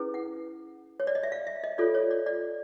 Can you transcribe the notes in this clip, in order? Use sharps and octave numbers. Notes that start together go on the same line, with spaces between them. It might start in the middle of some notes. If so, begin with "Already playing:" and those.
Already playing: C#4 E4 G#4 B4
F#5
C#5
D5
D#5
E5
F5
E5
D#5
F4 A4 C#5 D5
C#5
D5
D5